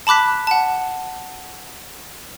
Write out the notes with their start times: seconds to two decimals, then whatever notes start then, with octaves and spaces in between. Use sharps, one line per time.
0.07 A5 B5 D6 F#6 B6
0.47 F#5 A5